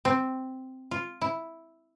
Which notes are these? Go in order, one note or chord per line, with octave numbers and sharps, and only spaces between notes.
C4
F4
E4